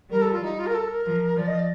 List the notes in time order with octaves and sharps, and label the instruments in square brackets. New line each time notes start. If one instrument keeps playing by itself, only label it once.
[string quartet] G3 [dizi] A#4
[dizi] A4
F4
D#4
F4
A#4
A4
A#4
[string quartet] F3
[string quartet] F3 [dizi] D5
[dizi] D#5
D5